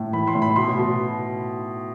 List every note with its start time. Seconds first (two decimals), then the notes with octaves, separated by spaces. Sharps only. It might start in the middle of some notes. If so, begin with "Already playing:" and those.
Already playing: A2
0.13 E3 B5
0.27 C6
0.35 A2
0.42 B5
0.56 B2 C6
0.78 B2